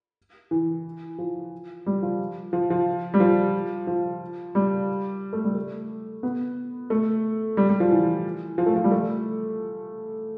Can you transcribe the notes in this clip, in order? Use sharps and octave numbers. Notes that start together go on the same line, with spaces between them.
E3
F3
G3
F3
F3
F3
G3
F3
F3
G3
A3
G3
A3
B3
A3
G3
G3
F3
E3
F3
A3
F3
G3
A3